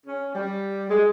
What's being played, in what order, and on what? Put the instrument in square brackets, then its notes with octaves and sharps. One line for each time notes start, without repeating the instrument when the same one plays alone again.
[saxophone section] C#4
G3
G#3